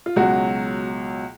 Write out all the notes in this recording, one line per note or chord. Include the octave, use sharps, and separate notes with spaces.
F4
C#2 B2 F#3 F#4